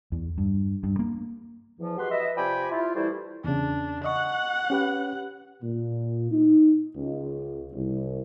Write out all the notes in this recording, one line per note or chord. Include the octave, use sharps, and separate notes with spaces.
E2
G2
G2
A#3
E2 F3
G#3 F#4 G4 B4 C6
B4 D#5 E5
C3 F3 D5 G5 G#5 B5
E4 F4
E3 G3 A3 E4 C5 D5
E2 C#3 D4
D#5 F#5 C#6 F#6
C#4 G4 B4
A#2
D#4
C#2
C2